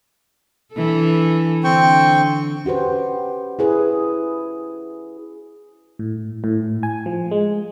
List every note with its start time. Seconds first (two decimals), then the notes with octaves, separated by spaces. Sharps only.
0.74 E3 D4 A4
1.64 D3 C4 G5 C#6
2.65 C#4 F#4 G4 B4 C5
3.59 E4 G#4 B4
5.99 A2
6.44 A2
6.83 G#5
7.06 F3
7.31 G#3